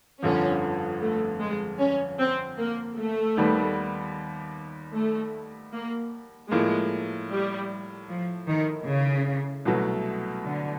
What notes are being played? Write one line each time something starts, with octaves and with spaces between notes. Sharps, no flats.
G1 F2 D3 F3 C#4
A3
G#3
C#4
C4
A#3
A3
D#2 D#3 G3 B3
A3
A#3
A2 F3 G#3 A#3
G3
F3
D#3
C#3
C2 B2 F#3 A3
D3